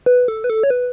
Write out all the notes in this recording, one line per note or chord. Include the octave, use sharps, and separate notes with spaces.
B4
A4
B4
A4
C#5
B4